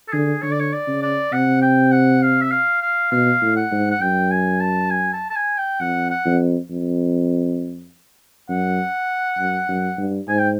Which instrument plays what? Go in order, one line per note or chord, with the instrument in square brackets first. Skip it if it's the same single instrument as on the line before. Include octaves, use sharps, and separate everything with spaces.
[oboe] A4
[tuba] D3 [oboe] G#4
[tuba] D3 [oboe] C#5
[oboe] D5
C#5
D5
[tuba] C#3
[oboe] D5
[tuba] C3 [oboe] F#5
[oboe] G5
F#5
F5
E5
F5
F5
[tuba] B2 [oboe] F5
[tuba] A2
[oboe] F#5
[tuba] G#2
[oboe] F#5
[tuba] F#2 [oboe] G5
[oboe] G#5
A5
G#5
A5
A5
G#5
G5
[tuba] F2 [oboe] F#5
[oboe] F#5
[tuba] F2
F2
[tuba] F#2 [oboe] F#5
[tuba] F#2
F#2
G2
[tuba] G#2 [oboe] G#5
[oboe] G5